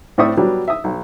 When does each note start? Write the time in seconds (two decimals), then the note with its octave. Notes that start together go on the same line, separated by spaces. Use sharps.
0.18 A2 C4 D5 E5 C#6 D#6
0.37 F#3 G3 B3 D4
0.68 E5 D#6
0.84 B1